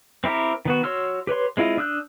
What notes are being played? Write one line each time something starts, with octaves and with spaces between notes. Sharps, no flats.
C4 E4 G4 A#4
D#3 B3 F#4
F#4 C#5 C6 E6 F6
G4 B4 C#5 C6
G#3 C4 E4 F4 D#5
D4 D#6 E6 F#6 G6